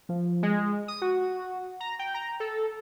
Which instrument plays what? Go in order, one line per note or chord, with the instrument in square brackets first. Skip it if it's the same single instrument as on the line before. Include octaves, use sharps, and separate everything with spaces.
[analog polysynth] F3
G#3
D#6
F#4
A#5
G5
A#5
A4